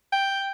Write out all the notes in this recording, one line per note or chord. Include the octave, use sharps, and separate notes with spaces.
G5